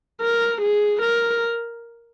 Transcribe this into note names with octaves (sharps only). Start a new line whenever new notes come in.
A#4
G#4
A#4